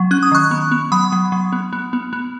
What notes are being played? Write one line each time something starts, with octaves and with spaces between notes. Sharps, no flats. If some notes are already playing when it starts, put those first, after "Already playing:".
Already playing: F#3
C#4 F#6
D#6
D#3 C#6 F#6
B3
B3
F#3 B5 D#6
F#3
F#3
B3
B3
B3
B3